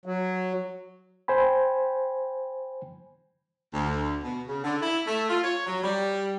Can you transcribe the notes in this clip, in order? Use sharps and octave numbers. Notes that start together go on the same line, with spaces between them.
F#3
C5 G5 G#5 B5
D2
B2
C#3
D3
E4
A3
F4
C#5
F#3
G3